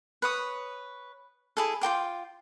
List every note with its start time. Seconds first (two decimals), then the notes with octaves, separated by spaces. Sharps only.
0.22 B4 C#5 D#6
1.57 E4 G#4 A4
1.81 F4 A#4 G5 D6